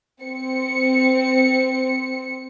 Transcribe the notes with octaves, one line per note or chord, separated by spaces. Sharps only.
C4 C#7